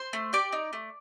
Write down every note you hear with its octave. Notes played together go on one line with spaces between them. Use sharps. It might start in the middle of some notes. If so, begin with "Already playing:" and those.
Already playing: C5 C6
A3
G4 D5 D6
D#4
A3